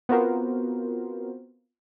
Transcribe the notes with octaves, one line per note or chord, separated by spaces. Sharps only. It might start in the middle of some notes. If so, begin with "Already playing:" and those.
B3 C4 F4 F#4 A#4 C5